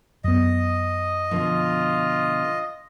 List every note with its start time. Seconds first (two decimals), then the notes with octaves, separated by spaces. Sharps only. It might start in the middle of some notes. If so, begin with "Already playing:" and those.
0.24 F#2 B3 D#5
1.31 B2 D3 F3 F4